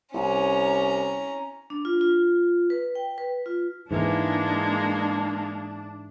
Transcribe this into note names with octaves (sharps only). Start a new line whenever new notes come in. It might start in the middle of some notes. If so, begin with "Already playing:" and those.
C2 C#4 A#5
D4
F4
F4
B4
G5
B4
F4
G#2 E3 G#3 A#3 D4